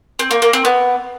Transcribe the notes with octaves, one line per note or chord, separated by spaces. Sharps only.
C4
A#3
A#3
C4
B3